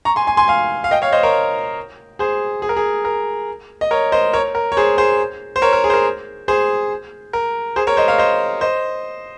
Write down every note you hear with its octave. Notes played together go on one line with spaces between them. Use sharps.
A#5 C#6
G#5 C6
G#5 C6
G#5 C6
F5 G#5
F5
D#5 G5
C#5 F5
C5 D#5
A#4 C#5
G#4 C5
G#4
A#4
G#4
A#4
D#5
A#4 C#5
C5 D#5
A#4 C#5
A#4
C#5
G#4 C5
G#4 C5
C5
A#4 C#5
A#4
G#4
C5
A#4
G#4 C5
A#4
G#4 C5
A#4 C#5
C5 D#5
C#5 F5
C5 D#5
C5 D#5